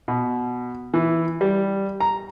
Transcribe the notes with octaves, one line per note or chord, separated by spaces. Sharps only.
B2
E3
G3
A#5